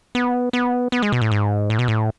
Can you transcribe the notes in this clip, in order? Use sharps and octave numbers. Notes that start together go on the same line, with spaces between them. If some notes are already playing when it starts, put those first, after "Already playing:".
B3
B3
B3
G#3
B2
A2
G#2
A2
B2
A2